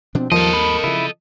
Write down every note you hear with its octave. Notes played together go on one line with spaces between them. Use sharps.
B2 F3 C4 D4
D#2 F3 G3 A4 A#4 D#5
B5
C#3 F3 E4